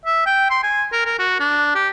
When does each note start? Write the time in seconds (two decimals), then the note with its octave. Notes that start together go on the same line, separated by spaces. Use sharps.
0.06 E5
0.26 G5
0.51 C6
0.63 G#5
0.93 A#4
1.06 A#4
1.19 F#4
1.40 D4
1.75 G4